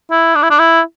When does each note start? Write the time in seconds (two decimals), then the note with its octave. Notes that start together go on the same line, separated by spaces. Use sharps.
0.11 E4
0.35 D4
0.43 E4
0.50 D4
0.59 E4